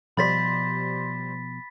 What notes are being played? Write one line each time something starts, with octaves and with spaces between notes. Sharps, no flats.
B2 F3 G3 C5 D5 B5 A6 B6